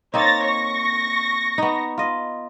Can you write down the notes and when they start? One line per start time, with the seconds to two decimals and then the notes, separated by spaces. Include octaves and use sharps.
0.14 A#3 C4 D#4 C#5 A6 A#6
0.43 C#6 A#6
1.58 B3 D#4
1.98 F4 D#5